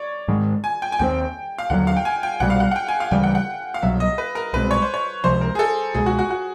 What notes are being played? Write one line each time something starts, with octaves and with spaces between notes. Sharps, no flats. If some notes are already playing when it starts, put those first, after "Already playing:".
Already playing: C#5 D5
G#2 D#3 G#3
G#5
G5
G#5
D#2 D#3 G#3 C4 G5
F5
D#2 D3 F#3 F#5
F5
G5
G#5
G5
C2 B2 G3 F#5
F5
F#5
F#5
G5
G#5
F5
D2 C#3 E3 G3 G5
F#5
F#5
F5
C2 B2 F#3 E5
D#5
B4
A#4
C2 B2 G#3 C4 B4
C#5
C5
C#5
C#2 C3 F3 C5
A#4
G#4
A4
C#2 B2 G#3 G#4
F#4
F#4
F#4